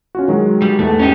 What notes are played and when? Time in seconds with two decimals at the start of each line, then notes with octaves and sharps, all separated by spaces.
0.15 C#4 F4 F#4
0.28 D#3 F#3 G#3
0.62 G3
0.79 E2 G#2 A3
0.99 C#4 D#4 G4